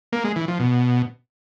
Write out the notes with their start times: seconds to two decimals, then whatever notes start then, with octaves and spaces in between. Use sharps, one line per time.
0.13 A#3
0.24 G#3
0.36 E3
0.48 F3
0.60 B2